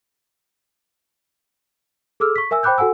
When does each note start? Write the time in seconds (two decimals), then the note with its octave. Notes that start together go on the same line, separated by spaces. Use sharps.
2.20 G#4 A4 D6 E6 F6
2.36 C#6 B6
2.51 A#4 E5 G#5 E6
2.63 C5 G5 B5 D6 F#6 G6
2.78 F#4 A4 F#5 G#5 E6